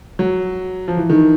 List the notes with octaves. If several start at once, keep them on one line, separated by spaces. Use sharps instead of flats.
F#3
F3
E3
D#3